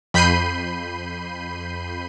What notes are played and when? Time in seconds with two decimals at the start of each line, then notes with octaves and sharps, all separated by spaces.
0.14 F2 B5 G6 C7 D#7